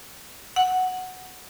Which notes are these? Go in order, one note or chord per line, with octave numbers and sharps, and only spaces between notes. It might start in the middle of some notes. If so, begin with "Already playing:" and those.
F#5